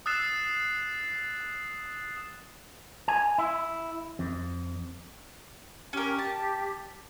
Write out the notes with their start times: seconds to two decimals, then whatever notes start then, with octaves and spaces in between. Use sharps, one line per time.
0.06 D#6 E6 F#6 A6 C7 E7
3.08 G#5
3.38 E4
4.19 F2
5.93 C#4 G4 A#4
6.19 A5